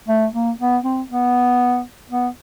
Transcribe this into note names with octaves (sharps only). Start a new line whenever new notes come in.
A3
A#3
B3
C4
B3
B3